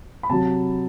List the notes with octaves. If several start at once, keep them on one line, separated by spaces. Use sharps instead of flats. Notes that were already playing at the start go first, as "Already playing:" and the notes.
B5
C3 F#3 A5